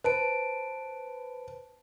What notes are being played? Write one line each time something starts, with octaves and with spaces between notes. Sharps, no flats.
B4 C5 A5 D7